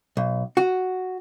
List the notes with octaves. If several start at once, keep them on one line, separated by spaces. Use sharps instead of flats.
B1
F#4